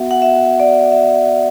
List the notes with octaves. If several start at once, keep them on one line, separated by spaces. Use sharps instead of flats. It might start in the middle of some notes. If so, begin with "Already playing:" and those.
Already playing: B3 F#4 E5 F#5
F#5
E5
D5
E5